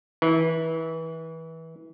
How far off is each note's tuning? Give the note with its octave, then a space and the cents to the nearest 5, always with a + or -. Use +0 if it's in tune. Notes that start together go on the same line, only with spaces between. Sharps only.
E3 -25